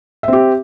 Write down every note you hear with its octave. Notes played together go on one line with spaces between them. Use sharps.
C4 G4 E5